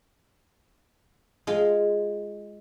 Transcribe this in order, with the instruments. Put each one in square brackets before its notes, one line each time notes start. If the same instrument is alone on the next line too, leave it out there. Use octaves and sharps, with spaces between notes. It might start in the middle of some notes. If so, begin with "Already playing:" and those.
[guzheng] G#3 F4